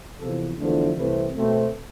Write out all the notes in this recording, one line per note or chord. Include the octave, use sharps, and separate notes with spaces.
E2 C3 F3 A4
E2 D3 F3 A3
C2 C3 E3 A3 C4 B4
B2 A3 C4